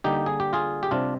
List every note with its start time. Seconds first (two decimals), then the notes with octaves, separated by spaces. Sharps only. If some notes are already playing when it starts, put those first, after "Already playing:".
0.04 D3 G3 A#3 D#4 G4
0.26 G#4
0.40 G4
0.53 F4 G#4
0.83 G4
0.91 C3 G3 C4 D4 F4